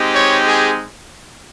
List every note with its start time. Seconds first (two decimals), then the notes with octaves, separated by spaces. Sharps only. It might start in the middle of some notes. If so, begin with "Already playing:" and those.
Already playing: G#3 C4 D#4 G4
0.14 C#5
0.47 G#4